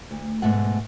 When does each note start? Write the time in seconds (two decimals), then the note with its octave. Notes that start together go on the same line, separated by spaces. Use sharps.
0.11 D2
0.42 G#2 B2 A3 F#5